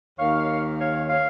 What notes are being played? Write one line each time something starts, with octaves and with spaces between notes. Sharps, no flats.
D#2 D#3 A#3 C#5 F5
C#5 F5
C#5 F5